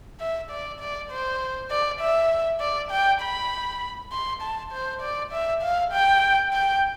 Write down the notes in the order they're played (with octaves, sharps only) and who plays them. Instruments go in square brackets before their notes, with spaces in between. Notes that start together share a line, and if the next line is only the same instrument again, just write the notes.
[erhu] E5
D5
D5
C5
D5
E5
D5
G5
B5
C6
A5
C5
D5
E5
F5
G5
G5